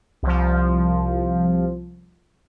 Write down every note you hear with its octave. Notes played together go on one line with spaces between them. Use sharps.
C2 F3